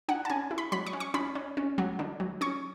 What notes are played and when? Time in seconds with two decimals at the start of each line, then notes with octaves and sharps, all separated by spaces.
0.09 D4 F#5
0.25 A5
0.30 C#4 G#5
0.51 E4
0.58 B5
0.72 F#3 B5
0.86 C#6
0.93 C#4
1.00 C#6
1.14 C#4 B5
1.35 C#4
1.57 C#4
1.78 F#3
1.99 D3
2.20 F#3
2.41 C#4 C#6